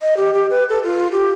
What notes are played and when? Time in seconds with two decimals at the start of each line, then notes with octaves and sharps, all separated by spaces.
0.02 D#5
0.17 G4
0.33 G4
0.50 B4
0.69 A4
0.84 F4
1.12 G4